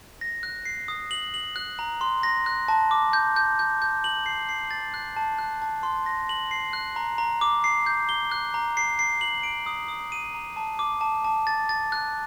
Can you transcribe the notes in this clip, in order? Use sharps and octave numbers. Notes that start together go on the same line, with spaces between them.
A#6
F#6
C7
D#6
F#7
F#7
F#6
A#5
C6
A#6
F#6
A5
D6
G6
G6
G6
G6
F#7
C7
C7
A6
F#6
A5
F#6
A5
C6
A#6
F#7
C7
F#6
A#5
A#5
D6
C7
G6
G7
F#6
A#5
C7
C7
F#7
D7
D#6
D#6
D#7
A#5
A5
D6
A5
A5
A6
A6
F#6